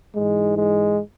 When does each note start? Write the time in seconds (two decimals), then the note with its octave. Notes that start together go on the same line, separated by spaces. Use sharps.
0.16 G#2 E3 G#3
0.58 G#3